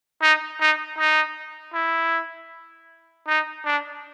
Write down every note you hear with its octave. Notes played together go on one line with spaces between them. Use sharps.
D#4
D#4
D#4
E4
D#4
D4